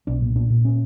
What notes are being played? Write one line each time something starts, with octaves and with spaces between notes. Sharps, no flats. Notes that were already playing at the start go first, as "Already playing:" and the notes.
B1 D4
A#2
A#2 D4
A#2
C#4